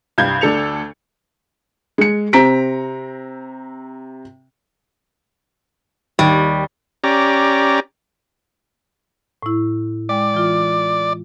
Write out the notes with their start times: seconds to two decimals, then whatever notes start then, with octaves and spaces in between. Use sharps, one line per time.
0.18 C2 G2 G3 F5 G6 G#6
0.41 D2 D4 A4 C#7 F7
1.98 G#3 C#7
2.33 C3 C4 A#5 B6 D7
6.19 D#2 G3
7.04 C#4 G4 D5 A#5
9.42 A2 E4
10.09 G#3 D5 G5
10.34 E3 F4